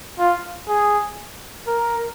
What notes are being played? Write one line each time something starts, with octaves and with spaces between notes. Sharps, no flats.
F4
G#4
A#4